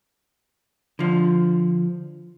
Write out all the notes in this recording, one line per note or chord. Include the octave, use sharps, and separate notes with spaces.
D3 F3